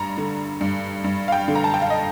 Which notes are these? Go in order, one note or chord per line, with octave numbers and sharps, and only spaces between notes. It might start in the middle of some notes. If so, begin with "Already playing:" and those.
Already playing: G2 A#5
D3
G2
G2
F5
G5
D3
A#5
A5
G5
F5
D#5